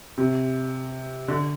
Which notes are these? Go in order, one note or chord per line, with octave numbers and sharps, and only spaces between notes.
C3
D3